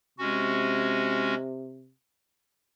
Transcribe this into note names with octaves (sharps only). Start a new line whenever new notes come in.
C3 G#3 C#4 F#4